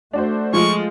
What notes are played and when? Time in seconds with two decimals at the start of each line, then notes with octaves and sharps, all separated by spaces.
0.13 A3 D4 F#4 C5
0.53 F3 G#3 F4 C#6